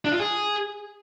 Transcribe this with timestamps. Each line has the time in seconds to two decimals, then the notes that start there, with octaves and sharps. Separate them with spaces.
0.05 D4
0.12 F4
0.20 G#4